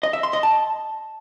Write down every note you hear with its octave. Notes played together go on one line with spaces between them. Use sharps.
D#5
E5
C6
D#5
A5